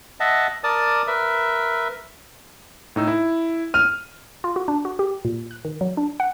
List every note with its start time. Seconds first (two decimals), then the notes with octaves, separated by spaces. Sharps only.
0.20 D#5 E5 F#5 A5
0.64 A#4 D5 A5 D#6
1.07 A#4 B4 E5
2.96 A2 D#4 E6
3.08 E4
3.74 F6 D#7
4.44 F4
4.56 F#4
4.68 D4
4.85 F#4
4.99 G4
5.25 A#2
5.51 F#6
5.65 D#3
5.81 F#3
5.97 D4
6.20 F#5